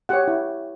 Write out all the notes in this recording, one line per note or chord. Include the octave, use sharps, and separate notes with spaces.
G4 C#5 F#5
E4